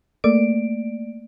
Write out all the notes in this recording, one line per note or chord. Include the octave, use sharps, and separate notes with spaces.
A3 A#3 D5 D7